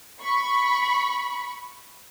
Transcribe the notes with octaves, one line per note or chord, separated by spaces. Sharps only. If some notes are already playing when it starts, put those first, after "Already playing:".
B5 C#6